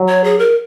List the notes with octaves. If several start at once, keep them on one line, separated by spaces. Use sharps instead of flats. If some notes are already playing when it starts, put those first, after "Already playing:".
Already playing: F#3
C#5
G#4
A#4